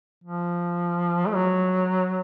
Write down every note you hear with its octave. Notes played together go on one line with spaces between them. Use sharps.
F3
A3
F#3